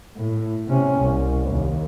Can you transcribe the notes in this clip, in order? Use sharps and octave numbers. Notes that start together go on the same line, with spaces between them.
A2
C3 C#4
C2
D#2